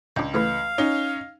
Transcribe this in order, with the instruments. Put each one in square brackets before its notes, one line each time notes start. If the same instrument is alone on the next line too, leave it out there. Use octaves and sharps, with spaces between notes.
[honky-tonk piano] C#2 [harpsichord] D4 G5
[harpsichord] E3 A3 B4 [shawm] F5
[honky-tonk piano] C#4 D#4